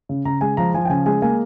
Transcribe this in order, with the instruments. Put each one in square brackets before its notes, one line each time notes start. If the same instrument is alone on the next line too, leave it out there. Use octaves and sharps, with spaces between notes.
[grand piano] C#3
C#3 A#5
G#3 G#5
F3 A#5
F3 G#5
G5
C#3 G#5
G#3 G#5
A#3 G#5